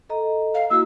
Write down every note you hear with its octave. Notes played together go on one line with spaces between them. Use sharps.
A4 D#5 A#5
F5
A#3 E4 F#4 E6